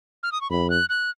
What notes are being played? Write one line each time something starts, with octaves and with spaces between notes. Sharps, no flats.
F6
D#6
C#6
F2 B5
F#6
F#6